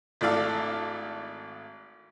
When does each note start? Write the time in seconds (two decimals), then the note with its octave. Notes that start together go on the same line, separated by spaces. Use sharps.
0.21 G#1 A3 D4 E4 A4 F5